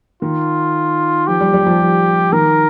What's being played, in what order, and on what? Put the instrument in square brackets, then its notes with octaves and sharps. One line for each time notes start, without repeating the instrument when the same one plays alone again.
[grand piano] D#3 [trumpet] F4
[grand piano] F3 [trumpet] G4
[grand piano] G3
G3
F3
F3
[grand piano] D#3 [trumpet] A#4